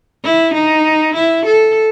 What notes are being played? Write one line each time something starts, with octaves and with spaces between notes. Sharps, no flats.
E4
D#4
E4
A4